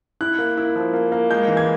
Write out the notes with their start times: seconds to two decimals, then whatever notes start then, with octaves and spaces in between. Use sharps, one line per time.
0.21 E4 F#6
0.39 A#3
0.57 E4
0.76 F3
0.93 A#3
1.12 A#3
1.30 G#3 G6
1.48 E3
1.57 G#6